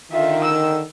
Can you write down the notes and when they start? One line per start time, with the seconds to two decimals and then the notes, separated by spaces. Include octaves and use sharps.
0.12 D3 D#3 F4 E5
0.44 E6